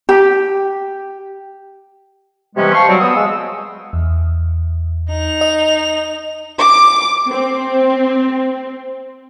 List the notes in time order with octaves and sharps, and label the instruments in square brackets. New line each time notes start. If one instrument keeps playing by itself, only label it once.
[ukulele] G4
[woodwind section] C3 E3 G3 G#3 B3 C#4
C5 F5 A5 C6 C#6
F#3 G3 C4
B3 D#6 E6
G#3 F5 E6
[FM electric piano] E2
[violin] D#4 F7
[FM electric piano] D#5
[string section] D6
C4